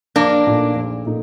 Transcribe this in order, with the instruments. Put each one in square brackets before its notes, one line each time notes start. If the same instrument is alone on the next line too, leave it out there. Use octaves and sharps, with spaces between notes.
[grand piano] A#1 [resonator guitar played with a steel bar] A#3 D4
[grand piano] A#2 A3 D#4
A#1
A#2 A3 D#4